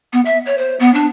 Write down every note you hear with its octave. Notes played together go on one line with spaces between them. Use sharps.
B3
E5
C#5
C5
B3
D4